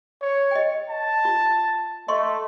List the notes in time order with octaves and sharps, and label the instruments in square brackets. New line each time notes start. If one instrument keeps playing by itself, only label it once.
[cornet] C#5
[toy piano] D#5 G5
[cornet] A5
[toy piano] F4
[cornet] A3 [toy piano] D#5 C6 C#6